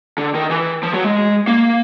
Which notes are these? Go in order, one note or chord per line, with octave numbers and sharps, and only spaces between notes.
D3
D#3
E3
F3
F#3
G#3
A#3